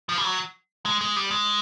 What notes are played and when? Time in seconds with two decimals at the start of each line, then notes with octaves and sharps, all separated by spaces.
0.09 F3
0.17 G3
0.24 F#3
0.85 G#3
1.01 G#3
1.16 G3
1.31 G#3